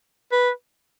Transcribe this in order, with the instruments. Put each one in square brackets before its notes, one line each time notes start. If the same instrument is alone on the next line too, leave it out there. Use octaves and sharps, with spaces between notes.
[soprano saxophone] B4